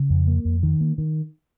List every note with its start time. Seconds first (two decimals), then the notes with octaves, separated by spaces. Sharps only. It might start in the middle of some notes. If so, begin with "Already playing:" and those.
Already playing: C#3
0.10 F2
0.27 A#3
0.45 F2
0.63 D#3
0.81 A#3
0.98 D#3